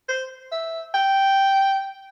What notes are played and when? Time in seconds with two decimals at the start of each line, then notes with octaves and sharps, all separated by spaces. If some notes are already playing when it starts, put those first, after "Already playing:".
0.09 C5
0.52 E5
0.94 G5